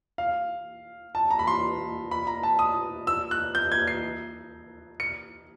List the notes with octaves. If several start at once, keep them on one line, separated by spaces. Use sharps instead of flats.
F5
A5
A#5
B5
C6
B5
A#5
A5
D#6
E6
F#6
G6
G#6
C7
C#7